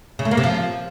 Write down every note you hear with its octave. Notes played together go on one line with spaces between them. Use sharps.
C#3
A3
A#3
C3
F3